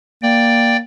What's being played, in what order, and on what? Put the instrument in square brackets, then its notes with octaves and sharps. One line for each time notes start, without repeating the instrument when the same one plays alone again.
[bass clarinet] A#3 [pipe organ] D5 G5